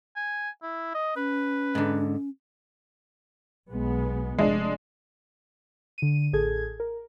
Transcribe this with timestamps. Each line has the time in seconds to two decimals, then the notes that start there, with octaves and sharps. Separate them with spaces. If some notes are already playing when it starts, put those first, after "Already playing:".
0.16 G#5
0.62 E4
0.94 D#5
1.16 C#4 B4
1.75 G#2 D3
3.70 B1 G#3 B3
4.38 F1 G#3 D4
5.98 D3 D#7
6.33 A1 G#4 A4 G#6
6.80 A#4